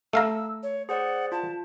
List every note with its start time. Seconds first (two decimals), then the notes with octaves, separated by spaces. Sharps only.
0.13 A3 F5 A#5 E6
0.63 C#5
0.89 G#4 C5 D5 F#5
1.32 F4 A5